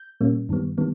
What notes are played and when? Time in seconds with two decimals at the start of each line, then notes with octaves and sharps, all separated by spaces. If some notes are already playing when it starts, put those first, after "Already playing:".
Already playing: G6
0.21 A#2 G3 A#3 C#4
0.49 G2 D#3 G3 B3
0.78 D#3 G3 B3